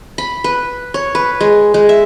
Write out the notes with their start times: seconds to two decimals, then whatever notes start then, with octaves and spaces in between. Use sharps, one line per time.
0.18 B5
0.44 B4
0.94 C#5
1.15 B4
1.41 G#3
1.74 G#3
1.89 E5